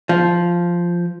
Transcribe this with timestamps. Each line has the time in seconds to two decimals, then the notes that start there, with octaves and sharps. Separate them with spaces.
0.09 F3